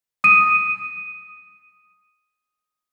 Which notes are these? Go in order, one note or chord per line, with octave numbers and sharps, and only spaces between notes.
D#6 D#7